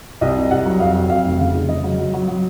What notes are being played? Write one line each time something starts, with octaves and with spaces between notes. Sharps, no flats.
C2 D#5
C3
C2 F#5
F#3
F2 F5
F#3
F2 F5
F1
C#3 F5
F1
C#3 D#5
F#3
F#3
F#3
F#3